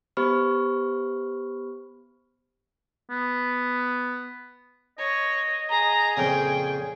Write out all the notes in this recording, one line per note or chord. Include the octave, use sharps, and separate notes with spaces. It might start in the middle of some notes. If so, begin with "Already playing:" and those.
B3 G4 C5 B5 C#6 F6
B3
C#5 D#5
G#4 A#5
F2 A#2 C#3 G5